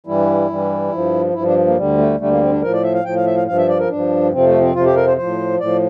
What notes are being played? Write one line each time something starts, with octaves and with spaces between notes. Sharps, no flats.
G2 E3 G3 E4
G2 E3 G3
G2 F3
G2 F3 E4
D4
A#3
D2 D3 G3
A3
D2 D3 G3 A3
A#3
C4
D4
A2 F3 A#4
D5
E5
F5
A2 F3 G5
F5
E5
F5
G2 F3 F5
E5
D5
A#4
G2 F3 D4
F2 C3 F3 C4
A3
C4
F2 C3 F3 F4
G4
A#4
C5
A2 F3 C5
A2 F3 D5